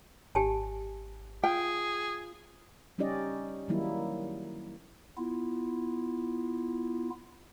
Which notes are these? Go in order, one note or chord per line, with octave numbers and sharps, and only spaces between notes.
G#1 G4 G#5 A5
F4 G#4 G5
G3 C#4 D#4 G4 D5 D#5
D#3 F#3 G3 A#3 D#4 E4
B3 E4 F4